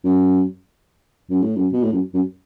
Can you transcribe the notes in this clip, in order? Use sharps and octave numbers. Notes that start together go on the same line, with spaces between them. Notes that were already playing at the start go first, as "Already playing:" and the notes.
F#2
F#2
A2
F#2
B2
A2
F#2
F#2